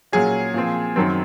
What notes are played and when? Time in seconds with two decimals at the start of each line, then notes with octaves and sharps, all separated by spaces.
0.12 A#2 F#3 C#4 G#4
0.54 A#2 F3 C4
0.96 F#2 D#3 F#3 C4